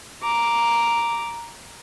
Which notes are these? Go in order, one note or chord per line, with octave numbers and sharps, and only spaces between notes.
A#5 D6